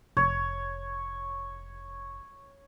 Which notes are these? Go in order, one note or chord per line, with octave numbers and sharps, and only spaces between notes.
F1 C#5